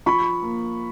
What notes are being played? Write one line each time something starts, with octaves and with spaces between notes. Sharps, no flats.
F3 B5 C#6
A#3